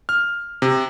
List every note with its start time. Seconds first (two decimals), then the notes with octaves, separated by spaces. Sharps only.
0.09 F6
0.62 C3